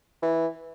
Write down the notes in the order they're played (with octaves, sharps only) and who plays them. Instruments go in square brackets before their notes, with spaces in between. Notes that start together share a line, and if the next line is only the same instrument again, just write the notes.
[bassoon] E3